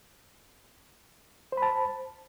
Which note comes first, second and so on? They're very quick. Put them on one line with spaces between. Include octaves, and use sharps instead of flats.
C5 B5 A5